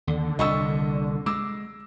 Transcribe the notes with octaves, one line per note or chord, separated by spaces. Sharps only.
D#2 D3
C2 A#2 D#5 C#6 E6
G#3 D6 E6